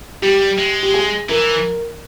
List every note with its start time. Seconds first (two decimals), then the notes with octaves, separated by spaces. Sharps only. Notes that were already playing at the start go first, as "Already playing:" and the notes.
0.22 G3 G4
0.58 G#3
0.83 G4
0.94 G#4
1.29 E3 A#4